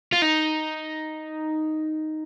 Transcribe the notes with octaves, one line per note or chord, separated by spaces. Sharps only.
F4
D#4